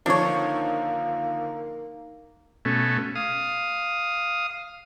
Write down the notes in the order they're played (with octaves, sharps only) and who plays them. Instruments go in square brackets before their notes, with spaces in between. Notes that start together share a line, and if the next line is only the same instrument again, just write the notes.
[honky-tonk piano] D3 D#3 F3 [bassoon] A#3 [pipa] D4 C#5 [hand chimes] D#4 E6
[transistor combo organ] B2 A3 C#4
F5 D#6